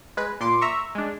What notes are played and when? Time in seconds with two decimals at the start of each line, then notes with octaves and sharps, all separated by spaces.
0.17 G#3 B4
0.40 A#2 C6 D6
0.61 E5 A#5 C#6
0.95 G#3 D4